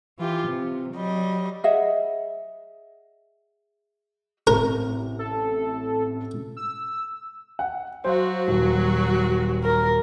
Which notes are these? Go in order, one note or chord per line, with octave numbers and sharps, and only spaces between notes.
E3 F4 G4
C3
F#3 G3 D#5
G#4 D#5 E5 F#5
A1 C3 A#4
A4
E6
F#5
F#3 F#4 C5 F5
D#1
A#4